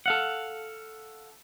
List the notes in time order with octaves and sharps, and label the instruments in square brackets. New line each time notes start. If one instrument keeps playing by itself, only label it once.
[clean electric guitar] A4 F5 F#5